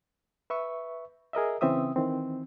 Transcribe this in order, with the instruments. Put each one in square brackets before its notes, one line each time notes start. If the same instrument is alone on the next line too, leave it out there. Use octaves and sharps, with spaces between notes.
[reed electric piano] B4 E5 C#6
G#4 A#4 D#5 E5
C#3 E3 C4 C#4 E5 D#6
D#3 E3 C4